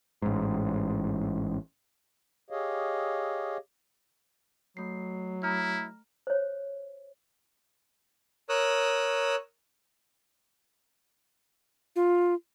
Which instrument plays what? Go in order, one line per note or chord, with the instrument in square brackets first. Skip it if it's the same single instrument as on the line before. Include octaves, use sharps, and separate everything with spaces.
[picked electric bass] A1 G#2
[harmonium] G4 G#4 C#5 D#5 F5
[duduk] F#3 [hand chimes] A3 C7
[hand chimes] A3 A#5 F6 [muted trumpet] E4
[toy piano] C5 C#5
[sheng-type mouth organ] A#4 C#5 D#6 E6 F#6
[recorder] F4